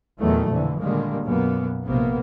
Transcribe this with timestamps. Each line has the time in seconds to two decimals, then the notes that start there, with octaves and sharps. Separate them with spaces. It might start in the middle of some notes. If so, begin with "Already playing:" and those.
0.19 E2 A#2 D#3 E3 F#3 A3
0.48 A#1 F2 B2 D3 E3
0.78 A#2 D3 D#3 G3 G#3 A#3
1.24 B1 F#2 B2 A#3 B3
1.85 A#1 C3 A#3 B3